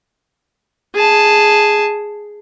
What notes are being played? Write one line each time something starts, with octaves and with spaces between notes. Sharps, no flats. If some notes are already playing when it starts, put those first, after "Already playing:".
G#4 A5